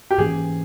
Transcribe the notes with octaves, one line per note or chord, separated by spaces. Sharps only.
G4
G#2 E3 A#3 C#4 G#4